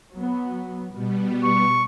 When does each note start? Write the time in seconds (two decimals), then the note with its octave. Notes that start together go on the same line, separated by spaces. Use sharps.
0.11 F#3 B3
0.92 B2 G3 B3
1.44 C#6